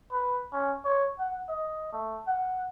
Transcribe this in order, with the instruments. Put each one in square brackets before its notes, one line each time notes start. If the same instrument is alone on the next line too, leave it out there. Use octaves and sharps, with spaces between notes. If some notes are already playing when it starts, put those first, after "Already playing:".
[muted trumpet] B4
C#4
C#5
F#5
D#5
A3
F#5